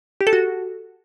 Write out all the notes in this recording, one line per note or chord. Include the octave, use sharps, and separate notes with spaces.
G4
A4
F#4